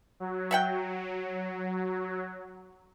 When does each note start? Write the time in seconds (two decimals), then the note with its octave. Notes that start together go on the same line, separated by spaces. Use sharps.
0.20 F#3
0.51 E5 F#5 G5